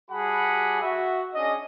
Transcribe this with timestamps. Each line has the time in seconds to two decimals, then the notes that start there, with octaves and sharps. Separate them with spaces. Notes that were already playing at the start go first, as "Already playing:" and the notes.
0.10 G3 F#4 G#4 F#5 A5 B5
0.81 F#4 E5
1.35 C#4 D4 G#4 D#5